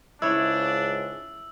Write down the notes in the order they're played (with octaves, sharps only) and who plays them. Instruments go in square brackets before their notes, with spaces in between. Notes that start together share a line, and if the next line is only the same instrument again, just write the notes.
[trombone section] C#2 G#2 C#3 [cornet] D4 [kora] E4 C#5 [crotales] E6